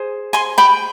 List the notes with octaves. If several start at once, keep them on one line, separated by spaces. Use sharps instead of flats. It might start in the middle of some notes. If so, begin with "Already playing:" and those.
Already playing: G#4 C5
G#5 C6
G5 B5